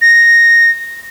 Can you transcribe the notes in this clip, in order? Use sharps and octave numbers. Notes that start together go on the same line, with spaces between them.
A#6